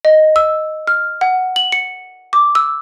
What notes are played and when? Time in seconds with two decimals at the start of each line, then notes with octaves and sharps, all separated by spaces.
0.05 D#5
0.36 E6
0.87 F6
1.21 F#5
1.56 F#7
1.72 C#7
2.33 D6
2.55 E6